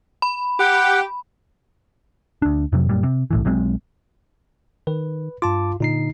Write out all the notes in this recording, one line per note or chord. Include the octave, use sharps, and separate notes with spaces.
B5
G4 F#5
D2 D4
F2 C3 F#3
F#2 A#2 G3
C3
B1 A2 E3
B1 F#3 G#3 C4
D#3 B4
G2 F4 A5 D6
A#2 D3 D#4 C7